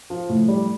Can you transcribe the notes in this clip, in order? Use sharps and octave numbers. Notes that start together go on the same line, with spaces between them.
F3
A2
G3